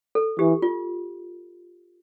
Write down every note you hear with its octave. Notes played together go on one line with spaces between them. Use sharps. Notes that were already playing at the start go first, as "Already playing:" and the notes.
A4
E3 G4
F4